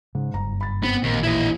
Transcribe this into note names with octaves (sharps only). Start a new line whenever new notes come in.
G#2 C#3
F#1 G2 A#5
B5 A6
B3 C4
A1 D#2 A#2
D#2 E3 E4 D#5